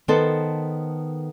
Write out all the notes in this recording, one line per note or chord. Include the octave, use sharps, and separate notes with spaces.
D#3 B3 A4 C5 A5